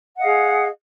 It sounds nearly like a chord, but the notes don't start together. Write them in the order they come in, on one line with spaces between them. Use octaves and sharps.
F#5 D#5 F5 G#4